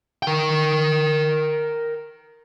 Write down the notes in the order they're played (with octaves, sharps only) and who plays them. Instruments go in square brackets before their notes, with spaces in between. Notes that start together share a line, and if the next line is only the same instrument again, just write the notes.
[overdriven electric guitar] A#4 G5